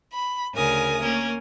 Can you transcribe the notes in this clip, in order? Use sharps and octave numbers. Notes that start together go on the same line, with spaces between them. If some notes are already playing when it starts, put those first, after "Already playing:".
B5
D2 C#3 A#4 G#5 D#6
A#3 C#4 A#4